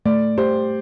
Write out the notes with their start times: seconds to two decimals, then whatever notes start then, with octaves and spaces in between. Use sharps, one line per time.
0.05 A3 D5
0.38 G4 C5